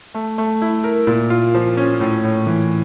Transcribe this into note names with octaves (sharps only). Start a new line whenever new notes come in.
A3
A3
E4
A#4
A#2
F4
F3
C#4
A2
A2
E3